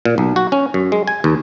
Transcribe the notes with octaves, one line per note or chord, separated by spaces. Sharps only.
A#2
B1
F#4
C#4
F#2
G#3
G#5
D#2